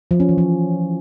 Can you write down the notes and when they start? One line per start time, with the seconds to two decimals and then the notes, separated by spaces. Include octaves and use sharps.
0.11 F3
0.20 C#4
0.29 E3
0.38 F3